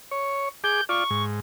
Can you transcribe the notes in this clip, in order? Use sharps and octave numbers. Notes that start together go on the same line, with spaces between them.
C#5
G#4 D6 G6
F4 D5 C#6
G#2